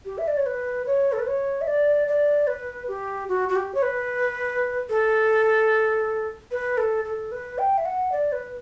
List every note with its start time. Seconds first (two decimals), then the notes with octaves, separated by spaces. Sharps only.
0.05 G4
0.18 E5
0.27 D5
0.37 C#5
0.46 B4
0.86 C#5
1.12 A4
1.19 B4
1.27 C#5
1.61 E5
1.67 D5
2.08 D5
2.47 B4
2.88 G4
3.29 F#4
3.49 F#4
3.56 G4
3.74 C#5
3.82 B4
4.89 A4
6.51 B4
6.77 A4
7.05 A4
7.32 B4
7.58 G5
7.78 E5
7.85 F#5
8.12 D5
8.32 B4